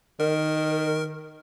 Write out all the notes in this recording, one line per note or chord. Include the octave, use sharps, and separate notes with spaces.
D#3 A#4